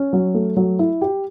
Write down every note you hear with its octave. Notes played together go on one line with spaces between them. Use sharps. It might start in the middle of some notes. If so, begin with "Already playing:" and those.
Already playing: C#4
F#3
A3
F#3
E4
G4